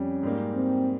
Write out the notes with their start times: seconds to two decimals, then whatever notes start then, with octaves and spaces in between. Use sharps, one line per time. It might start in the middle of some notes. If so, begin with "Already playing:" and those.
Already playing: F2 G3 C#4
0.23 G#2 G3 A#3
0.55 C4